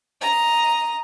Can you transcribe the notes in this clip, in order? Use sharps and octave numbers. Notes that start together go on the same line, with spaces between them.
D#5 A#5